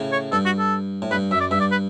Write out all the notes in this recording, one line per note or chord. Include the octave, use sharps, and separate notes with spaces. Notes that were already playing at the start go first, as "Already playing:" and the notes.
Already playing: A2 C#3
C#5
G2 A4
F#4
A4
A2
G2 B4
F#2 E5
D5
G2 E5
D5
B4